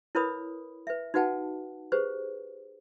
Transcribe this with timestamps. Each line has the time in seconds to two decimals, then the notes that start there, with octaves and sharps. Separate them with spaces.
0.15 E4 A#4 B4 C#5 B5 D#6
0.87 B4 E5
1.14 D#4 F#4 B4 F#5 G5 A5
1.92 G4 G#4 B4 C5